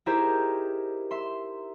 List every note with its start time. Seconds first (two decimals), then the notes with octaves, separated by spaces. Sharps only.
0.06 D#4 E4 G4 G#4 A#4 C5
1.11 E5 C6